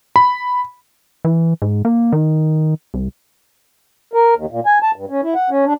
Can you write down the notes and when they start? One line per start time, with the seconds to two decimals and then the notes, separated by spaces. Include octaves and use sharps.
0.16 B5
1.25 E3
1.62 G#2
1.85 A#3
2.13 D#3
2.94 C2
4.13 A#4
4.36 D#2
4.51 A#2
4.66 G#5
4.83 A5
4.96 G2
5.10 C#4
5.23 E4
5.35 F#5
5.50 C#4
5.65 D4